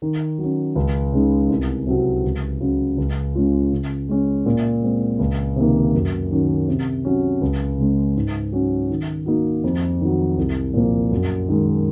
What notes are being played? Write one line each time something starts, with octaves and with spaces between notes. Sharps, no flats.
D#3
F#3
C#4
C#2
C#3 G#3 D#4
C2
C3 F#3 C4 F#4
C#2
C#3 F#3
C#2
C#3 G#3 C#4 F4
C#3
G#3 C#4
A#2
G#3 C4
C#2
C3 D#3 A#3
F#2
D#3 F#3 C#4
C3
F#3 C#4
C#2
C#3 G#3 C#4
G#2
F#3 C#4
D#3
A#3 D#4 F#4
F2
D#3 F#3
C2
A#2 F3 A#3
F#2
D#3 G#3